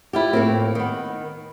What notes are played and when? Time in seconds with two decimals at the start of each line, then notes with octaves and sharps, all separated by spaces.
0.13 E4 F4 G4
0.33 A2 A#3 C4
0.75 D#3 B3